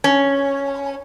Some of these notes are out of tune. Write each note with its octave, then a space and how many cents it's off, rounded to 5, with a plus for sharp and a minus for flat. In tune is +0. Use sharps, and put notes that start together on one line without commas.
C#4 +0